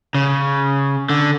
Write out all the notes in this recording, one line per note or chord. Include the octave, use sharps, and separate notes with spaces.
C#3
D3